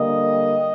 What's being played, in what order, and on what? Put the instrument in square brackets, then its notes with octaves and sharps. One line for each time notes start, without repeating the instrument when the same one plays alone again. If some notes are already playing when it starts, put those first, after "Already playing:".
Already playing: [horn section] D3 G3 A#3 D#5